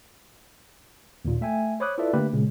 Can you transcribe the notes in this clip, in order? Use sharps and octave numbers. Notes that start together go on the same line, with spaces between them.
D#2 A#2
A3 E5 G5 G#5
C5 C#5 B5 D6 D#6 F#6
E4 F4 A4 B4 D5 E5
D3 A3 A#3 D4 G4 B4
A#2 C#3 G#3